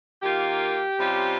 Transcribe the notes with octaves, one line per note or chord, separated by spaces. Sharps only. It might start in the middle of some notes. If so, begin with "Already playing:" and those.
D#3 A#3 F4 G4
C3 G3 C#4 F4